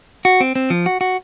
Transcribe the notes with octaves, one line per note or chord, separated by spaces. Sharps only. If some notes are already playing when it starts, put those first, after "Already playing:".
F#4
C4
C4
F3
F#4
F#4